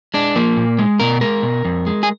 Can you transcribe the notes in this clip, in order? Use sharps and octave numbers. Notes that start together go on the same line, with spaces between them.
G#3 D4
F3 A#3
A#2
G#3
B2 A#4
G#3 A#4
B2
F2
G#3
G#4